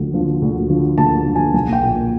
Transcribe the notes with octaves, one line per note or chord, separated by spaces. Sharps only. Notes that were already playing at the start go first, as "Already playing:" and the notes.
Already playing: D2 D3 F3
D3 F3
D2
D3 F3
D2 A5
D3 F3
G#5
B1 G#5
G5
A#2 F3